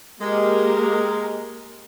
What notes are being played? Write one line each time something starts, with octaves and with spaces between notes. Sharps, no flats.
G#3 A#3 G4 A#4